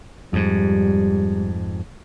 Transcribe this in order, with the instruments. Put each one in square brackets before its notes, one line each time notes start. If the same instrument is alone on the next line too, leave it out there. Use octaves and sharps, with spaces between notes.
[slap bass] F2 G#2 [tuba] G3